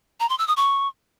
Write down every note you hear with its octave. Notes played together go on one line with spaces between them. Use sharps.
A#5
C6
E6
D#6
C#6